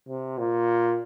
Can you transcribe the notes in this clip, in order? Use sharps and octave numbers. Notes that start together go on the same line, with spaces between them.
C3
A#2